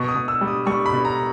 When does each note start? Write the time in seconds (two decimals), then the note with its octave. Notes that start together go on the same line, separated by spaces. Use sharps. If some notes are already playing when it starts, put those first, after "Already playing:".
Already playing: B2 C#6
0.08 D#6
0.15 B2
0.28 E6
0.41 G3
0.47 D#6
0.66 G3 C#6
0.86 B5
0.93 B2
1.05 A#5